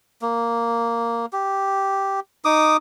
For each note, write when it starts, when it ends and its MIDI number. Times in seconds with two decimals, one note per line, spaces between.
0.22 1.26 58
1.33 2.20 67
2.45 2.77 63
2.45 2.77 86
2.45 2.77 87